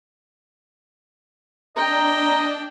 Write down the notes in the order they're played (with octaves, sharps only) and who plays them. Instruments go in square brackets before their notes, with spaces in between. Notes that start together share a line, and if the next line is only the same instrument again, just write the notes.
[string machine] D4 [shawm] D#5 [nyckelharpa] G5 [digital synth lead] A#5